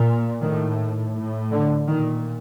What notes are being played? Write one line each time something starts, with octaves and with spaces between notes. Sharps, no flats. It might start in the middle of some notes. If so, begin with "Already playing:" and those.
Already playing: A#2
A2 D#3
A2
D3
A#2 D#3